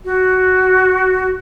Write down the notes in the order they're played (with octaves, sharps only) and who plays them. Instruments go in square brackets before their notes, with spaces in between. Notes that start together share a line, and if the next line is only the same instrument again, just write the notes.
[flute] F#4